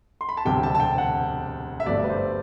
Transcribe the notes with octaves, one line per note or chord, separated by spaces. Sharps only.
C6
B5
A5
E1 D2 C3 G3 G5
A5
A5
G5
F#5
E5
G1 G2 F#3 A3 D5
B4
C5